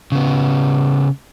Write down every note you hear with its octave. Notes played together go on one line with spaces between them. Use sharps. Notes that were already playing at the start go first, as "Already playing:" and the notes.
C#3 B3